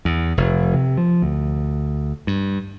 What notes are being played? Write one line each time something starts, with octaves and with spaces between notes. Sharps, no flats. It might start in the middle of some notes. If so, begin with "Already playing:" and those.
E2
F1
C3
F3
D2
G2